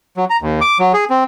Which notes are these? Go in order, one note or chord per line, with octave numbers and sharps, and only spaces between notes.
F#3
A#5
D#2
D6
F#3
G#4
C4